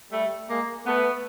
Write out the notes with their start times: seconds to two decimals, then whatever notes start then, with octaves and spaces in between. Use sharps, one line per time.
0.12 G3 A3
0.49 G#3 A#3
0.86 A3 B3